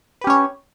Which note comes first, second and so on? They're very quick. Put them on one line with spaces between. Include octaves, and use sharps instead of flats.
B4 G4 C#4 C#5